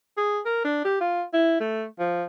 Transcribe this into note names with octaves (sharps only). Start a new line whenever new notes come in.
G#4
A#4
D4
G4
F4
E4
A3
F3